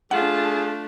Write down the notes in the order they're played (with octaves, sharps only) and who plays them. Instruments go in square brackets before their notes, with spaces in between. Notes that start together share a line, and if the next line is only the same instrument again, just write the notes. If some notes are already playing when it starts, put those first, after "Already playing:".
[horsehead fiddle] A3 D4 [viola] F4 A5 [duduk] G#4 [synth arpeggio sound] F#5